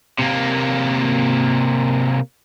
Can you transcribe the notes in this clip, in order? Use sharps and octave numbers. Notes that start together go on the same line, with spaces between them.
C3 A#3